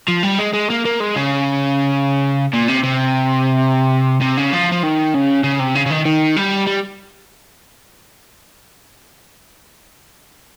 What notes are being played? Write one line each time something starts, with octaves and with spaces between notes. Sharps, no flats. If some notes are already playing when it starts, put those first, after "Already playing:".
F3
G3
G#3
G#3
A#3
A#3
G#3
C#3
A#2
C3
C3
C3
C#3
F3
F3
D#3
C#3
C#3
C3
C#3
C#3
D#3
D#3
G3
G3